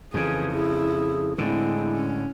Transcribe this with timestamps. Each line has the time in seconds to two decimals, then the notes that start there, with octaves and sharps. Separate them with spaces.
0.14 F2 C#3 E3 G#4
0.53 E4 G#4
1.38 A2 D3 G#3 C4 E4
1.92 C#4